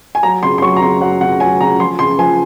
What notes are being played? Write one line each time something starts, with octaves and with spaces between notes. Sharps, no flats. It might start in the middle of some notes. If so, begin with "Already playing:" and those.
G#5
F#3 A#5
C#3 C6
C6
F#3 C#6
A#5
C#3 C6
F#3 F#5
C#3 F#5
F#3 G#5
C#3 A#5
F3 C6
C#3 C6
F3 G#5